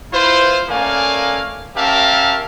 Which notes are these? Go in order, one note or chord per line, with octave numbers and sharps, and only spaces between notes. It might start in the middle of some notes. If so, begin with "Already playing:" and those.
E4 F4 B4 C5
A3 A#3 C#4 D5 F5 G#5
C#4 G4 A#4 E5 F5 A5